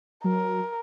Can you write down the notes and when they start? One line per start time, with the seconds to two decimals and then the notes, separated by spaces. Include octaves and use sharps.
0.24 F#3 A#4